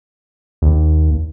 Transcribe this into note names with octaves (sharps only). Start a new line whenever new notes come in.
D#2